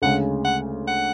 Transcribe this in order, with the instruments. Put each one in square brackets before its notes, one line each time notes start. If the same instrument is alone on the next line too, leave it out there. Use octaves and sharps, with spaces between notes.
[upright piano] D2 C#3 G#3 [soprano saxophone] F#5
[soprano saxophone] F#5
F#5